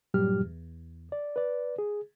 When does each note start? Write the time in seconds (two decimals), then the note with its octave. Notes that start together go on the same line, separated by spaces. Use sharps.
0.14 G2 A#2 F#3 G3 G4 F6
0.40 E2
1.12 D5
1.36 B4 D5
1.78 G#4